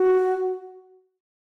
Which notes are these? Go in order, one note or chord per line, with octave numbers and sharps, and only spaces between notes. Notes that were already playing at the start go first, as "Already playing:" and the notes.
Already playing: F#4